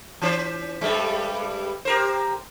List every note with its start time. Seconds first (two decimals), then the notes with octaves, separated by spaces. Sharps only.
0.22 E3 C#4 C5
0.81 G2 G3 G#3
1.85 G4 A#4 C5